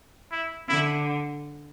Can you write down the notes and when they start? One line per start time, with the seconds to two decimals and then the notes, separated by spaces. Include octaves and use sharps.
0.32 E4
0.68 D3 E4